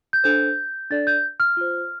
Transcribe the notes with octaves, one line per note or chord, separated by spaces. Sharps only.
G6
D4 A4 C5 G6
D4 A4 D5 A6
G6
F6
F4 C5